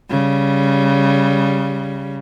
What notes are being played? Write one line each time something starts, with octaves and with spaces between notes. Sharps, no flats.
C#3 G3